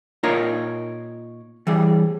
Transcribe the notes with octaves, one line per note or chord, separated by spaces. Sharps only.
A#2 D#4 F4 A#4 C#5 A#5
E3 G3 G#4